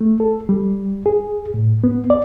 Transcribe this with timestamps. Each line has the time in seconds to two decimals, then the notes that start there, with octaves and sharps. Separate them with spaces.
0.01 A3
0.20 A4
0.49 G3
1.06 G#4
1.54 A2
1.84 B3
2.10 D5